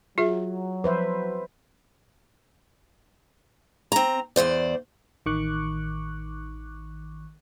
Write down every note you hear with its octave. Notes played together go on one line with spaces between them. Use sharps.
F#3 F4 G#4 E5
F3 B4 C5 E5
C4 A#5
E2 E3 C5 D5
A1 D#3 C#6 D6 F#6